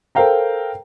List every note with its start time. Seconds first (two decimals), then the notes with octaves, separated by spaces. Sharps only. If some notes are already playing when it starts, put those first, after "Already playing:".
0.15 A4 A#4 C5 F5 G5 A#5